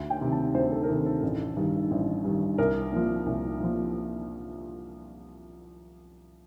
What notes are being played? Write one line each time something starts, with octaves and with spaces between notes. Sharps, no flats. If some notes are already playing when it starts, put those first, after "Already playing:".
Already playing: D2
G5
C3 D#3
A5
D2 C5
A4
A#4
C3 D#3 A4
A4
A1
G2 D#3
A1
G2 D#3
C2 A#4
A#2 F3
C2
A#2 F3